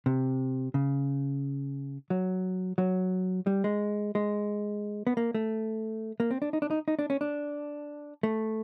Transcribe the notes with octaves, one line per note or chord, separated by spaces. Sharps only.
C3
C#3
F#3
F#3
G3
G#3
G#3
B3
A#3
A3
A#3
C4
D4
D#4
D4
D#4
D#4
D4
C#4
D4
A3